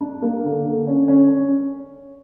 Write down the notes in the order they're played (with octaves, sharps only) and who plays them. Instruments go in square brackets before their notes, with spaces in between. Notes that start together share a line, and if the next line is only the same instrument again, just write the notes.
[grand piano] D4
A#3
D3
D3
C#4
C#4
C#4